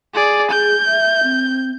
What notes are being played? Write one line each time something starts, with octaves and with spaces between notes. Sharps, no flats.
G#4 D5
G#4 G6
E5
C4